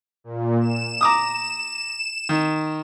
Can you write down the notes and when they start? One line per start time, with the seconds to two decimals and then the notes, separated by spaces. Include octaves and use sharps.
0.24 A#2
0.61 E7
1.01 A#5 D6 D#6
2.29 D#3